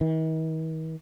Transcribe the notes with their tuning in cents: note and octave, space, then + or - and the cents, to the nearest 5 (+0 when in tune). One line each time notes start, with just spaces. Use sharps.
D#3 +45